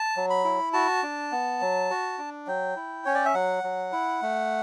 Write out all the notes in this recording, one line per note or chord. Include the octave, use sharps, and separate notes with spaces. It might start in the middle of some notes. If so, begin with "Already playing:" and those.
Already playing: A5
F#3
B5
E4
F#4 A5
D4
B3
F#3
F#4
D4
F#3 G5
E4
C#4 C#5
D5
E5
F#3 F#5
F#3
E4
A3